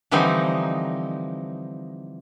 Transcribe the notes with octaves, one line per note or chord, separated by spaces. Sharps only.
D3 E3 F3 G3 C4 D#4